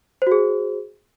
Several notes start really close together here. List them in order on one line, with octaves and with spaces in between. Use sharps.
C5 F#4 G#4